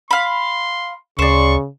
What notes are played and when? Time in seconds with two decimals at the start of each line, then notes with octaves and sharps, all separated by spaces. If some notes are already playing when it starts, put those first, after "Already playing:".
0.11 F5 B5 C6
1.19 D2 C#3 C5 D5 C#6